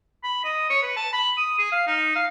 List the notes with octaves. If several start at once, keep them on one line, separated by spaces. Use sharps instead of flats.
B5
D#5
C#5
B4
A5
B5
D#6
G#4
F5
D#4
F5